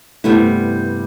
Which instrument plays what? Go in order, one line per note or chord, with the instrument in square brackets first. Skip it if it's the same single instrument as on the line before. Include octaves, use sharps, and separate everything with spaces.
[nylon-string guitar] G2 C3 G3 A3 B3 E4